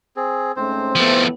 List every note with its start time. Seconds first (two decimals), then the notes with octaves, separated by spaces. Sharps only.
0.16 C4 G#4
0.57 G#2 A3 C4 C#4 C5
0.96 E2 A2 F3 A3 B3